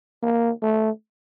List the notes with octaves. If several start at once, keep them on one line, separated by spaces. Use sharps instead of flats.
A#3
A3